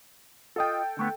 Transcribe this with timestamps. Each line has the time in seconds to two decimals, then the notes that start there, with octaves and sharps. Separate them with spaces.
0.56 F4 A4 D#5 G5
0.97 D3 A3 B3